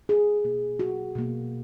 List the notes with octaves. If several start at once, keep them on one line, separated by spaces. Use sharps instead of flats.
G#4
B2 A#3
F#4
B2 A#3